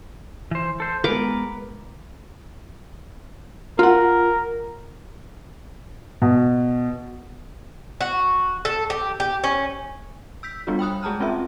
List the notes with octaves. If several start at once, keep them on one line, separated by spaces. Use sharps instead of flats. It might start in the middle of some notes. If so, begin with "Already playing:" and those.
E3 C5
A4 C5
G#3 B3 A#4 B4 D6
F4 A#4 F#5
B2
F#4
A4
G4
G4
C#4
E6 G6 B6
G3 B3 D4 F4 F#4
G5 B5 D#6 F#6
G#3 G#4 A5 A#5 F6
C4 C#4 F4 E5